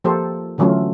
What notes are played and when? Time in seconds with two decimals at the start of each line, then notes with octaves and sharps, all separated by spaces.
0.04 F3 A#3 F4 G4 A4 C5
0.58 D3 E3 F#3 A3 C#4 F4